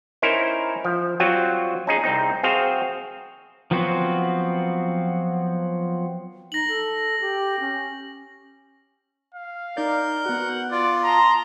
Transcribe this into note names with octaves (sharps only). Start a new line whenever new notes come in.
C#4 D#4 E4 A#4 C5
F3
F#3 G3 C4 F4 F#4
C#4 D#4 G#4
C2 C3 C4 D#4
C4 F#4 G#4 C5 F5
F3 F#3 B3 C4 F#4
D#4 A#6 F#7
A4
G4
C#4
F5
D#4 A#4 D5 G6
B3 F#4 F#5
F4 D5
A5 A#5 C6 D#6